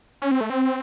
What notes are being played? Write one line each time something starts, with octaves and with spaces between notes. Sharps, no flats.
C#4
C4
A3
C4